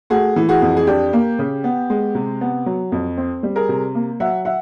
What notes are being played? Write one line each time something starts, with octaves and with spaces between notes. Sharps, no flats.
A3 F#4 G#4
E3
F#4 G#4
F2
G#4
D4 G4
A#3
C#3
B3
G#3
C3
B3
F#3
F2
C4
G3
G#4 A#4
C3
A#3
F#3 E5 F#5
E5 F#5